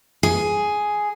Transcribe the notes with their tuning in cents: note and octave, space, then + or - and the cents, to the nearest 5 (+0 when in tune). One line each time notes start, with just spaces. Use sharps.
G#4 +5